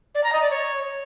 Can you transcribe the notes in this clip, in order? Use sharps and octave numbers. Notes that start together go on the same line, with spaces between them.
D5
A#5
D#5
D5
C#5